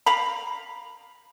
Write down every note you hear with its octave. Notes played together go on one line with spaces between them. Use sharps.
F5 A#5 B5